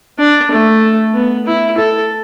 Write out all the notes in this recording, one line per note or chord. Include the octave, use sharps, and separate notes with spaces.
D4
A3
B3
E4
A4